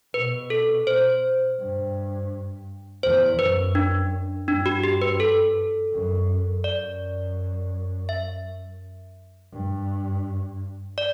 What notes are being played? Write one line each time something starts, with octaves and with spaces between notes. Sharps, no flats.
B2 B4
A4
C5
G2
E2 C5
F#2 B4
D4
G2 D4
F#4
G4
B4
A4
F#2
F#2 D5
E5
G2
D5